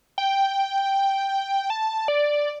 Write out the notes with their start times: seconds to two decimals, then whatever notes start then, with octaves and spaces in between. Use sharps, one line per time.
0.18 G5
1.70 A5
2.08 D5